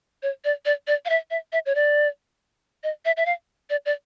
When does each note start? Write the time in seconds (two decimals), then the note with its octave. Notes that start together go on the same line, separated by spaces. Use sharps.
0.23 C#5
0.45 D5
0.66 D5
0.87 D5
1.05 F5
1.10 E5
1.31 E5
1.52 E5
1.66 C#5
1.75 D5
2.84 D#5
3.05 E5
3.17 E5
3.26 F5
3.70 D5
3.86 D5